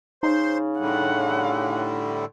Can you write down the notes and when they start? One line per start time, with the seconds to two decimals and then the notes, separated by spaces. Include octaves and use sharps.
0.23 C#3 D#4 C5 C6
0.80 A2 D3 G3 F#5